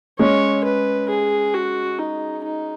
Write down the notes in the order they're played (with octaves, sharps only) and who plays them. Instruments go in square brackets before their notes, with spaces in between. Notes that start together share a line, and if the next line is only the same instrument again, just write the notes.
[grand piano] G#3 C#4 [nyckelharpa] C#5
[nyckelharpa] B4
G#4
F#4
D#4
D#4